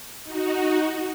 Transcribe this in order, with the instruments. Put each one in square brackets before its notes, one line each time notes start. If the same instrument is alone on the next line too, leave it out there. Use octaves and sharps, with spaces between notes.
[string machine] D#4 F#4